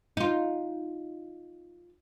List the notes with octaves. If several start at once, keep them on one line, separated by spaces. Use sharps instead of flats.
D#4 F4